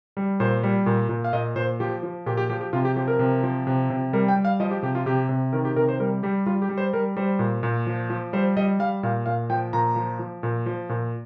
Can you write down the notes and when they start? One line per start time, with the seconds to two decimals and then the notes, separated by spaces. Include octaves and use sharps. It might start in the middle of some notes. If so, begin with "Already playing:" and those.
0.17 G3
0.40 A#2 C5
0.63 G3
0.86 A#2
1.09 A#2
1.24 F5
1.33 A#2 D#5
1.56 A#2 C5
1.80 F3 G4
2.03 F3
2.26 A#2 G4
2.37 G4
2.50 F3 G4
2.61 G4
2.73 C3 F4
2.85 G4
2.96 F3 G4
3.08 A#4
3.19 C3
3.43 F3
3.67 C3
3.90 C3
4.13 G3 A#4
4.28 G5
4.36 G3
4.45 F5
4.60 F3 D#5
4.71 G4
4.82 C3 G4
4.95 F4
5.06 C3 G4
5.29 C3
5.53 D#3 A#4
5.65 G4
5.76 C3 A#4
5.89 C5
6.00 G3 A#4
6.23 G3 G4
6.46 G3 F4
6.62 G4
6.69 G3
6.78 C5
6.93 G3 A#4
7.16 G3 C5
7.39 A#2
7.63 A#2
7.87 F3
8.10 F3
8.33 G3 C5
8.57 G3 D#5
8.79 G3 F5
9.03 A#2 F5
9.26 A#2 F5
9.50 F3 G5
9.73 A#2 A#5
9.96 F3
10.19 F3
10.43 A#2
10.66 F3
10.89 A#2